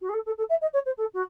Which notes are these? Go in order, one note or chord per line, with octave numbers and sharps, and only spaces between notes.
F#4
G#4
A4
A4
A4
E5
D#5
C#5
C5
A4
F#4